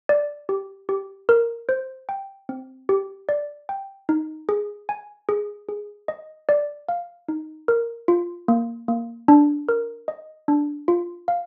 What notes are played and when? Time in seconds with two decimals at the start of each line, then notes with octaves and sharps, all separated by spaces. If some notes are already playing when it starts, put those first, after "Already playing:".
0.09 D5
0.49 G4
0.89 G4
1.29 A#4
1.69 C5
2.09 G5
2.49 C4
2.89 G4
3.29 D5
3.69 G5
4.09 D#4
4.49 G#4
4.89 G#5
5.29 G#4
5.69 G#4
6.08 D#5
6.49 D5
6.89 F5
7.29 D#4
7.68 A#4
8.08 F4
8.48 A#3
8.88 A#3
9.28 D4
9.69 A#4
10.08 D#5
10.48 D4
10.88 F4
11.28 F5